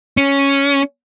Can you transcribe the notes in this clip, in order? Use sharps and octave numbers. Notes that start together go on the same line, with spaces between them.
C#4